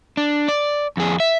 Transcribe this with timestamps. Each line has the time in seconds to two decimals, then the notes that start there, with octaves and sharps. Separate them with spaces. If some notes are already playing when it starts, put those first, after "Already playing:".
0.17 D4
0.48 D5
0.97 F2 G#4
1.20 E5